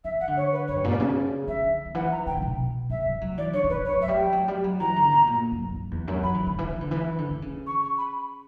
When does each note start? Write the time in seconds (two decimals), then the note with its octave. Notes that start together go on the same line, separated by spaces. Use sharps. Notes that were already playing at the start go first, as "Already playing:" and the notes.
0.04 E3 E5
0.20 F#5
0.28 D3
0.36 C#5
0.52 B4
0.67 F#2 C#5
0.76 G2
0.84 A#2 D5
0.92 B2
1.00 C#3
1.48 D3 E5
1.86 D3
1.95 E3 F#5
2.11 A#5
2.26 C#3 G5
2.37 C#3
2.42 B2
2.90 C#3 E5
3.06 G3
3.21 F#3
3.37 E3 D5
3.53 D3 C#5
3.64 D3
3.69 E3 B4
3.85 C#5
3.97 F#3 E5
4.08 G3
4.16 G5
4.33 F#3
4.48 G3
4.64 F#3
4.79 E3 A#5
4.96 D3
5.12 B2
5.27 A#2
5.52 F#2
5.76 F#2
5.91 E2
6.08 F#2
6.23 F#3 B5
6.34 E3
6.47 D3
6.58 E3
6.70 E3
6.81 D3
6.91 E3
7.18 D3
7.30 D3
7.42 C#3
7.66 C#6
7.82 C#6
7.97 B5